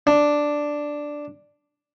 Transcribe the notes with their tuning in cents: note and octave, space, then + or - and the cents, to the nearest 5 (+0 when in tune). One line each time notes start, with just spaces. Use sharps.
D4 +0